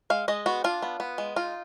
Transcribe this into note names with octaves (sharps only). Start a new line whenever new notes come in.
G#3 F5
G#3 D#5
B3 F#4
D4 F4
B3
B3
G#3
D#4 F4